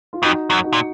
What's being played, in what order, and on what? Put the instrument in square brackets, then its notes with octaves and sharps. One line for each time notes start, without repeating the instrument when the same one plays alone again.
[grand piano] F4
[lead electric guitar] F2 [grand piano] D#4 F#4
[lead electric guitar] F#2
[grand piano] D#4 F#4
[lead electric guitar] A#2